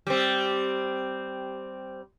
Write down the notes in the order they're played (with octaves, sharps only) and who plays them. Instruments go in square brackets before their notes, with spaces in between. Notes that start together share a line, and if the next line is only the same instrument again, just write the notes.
[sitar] G3 C4